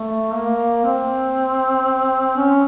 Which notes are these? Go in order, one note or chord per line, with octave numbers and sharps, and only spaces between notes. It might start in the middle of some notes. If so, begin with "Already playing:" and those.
Already playing: A3
A#3
C4
C#4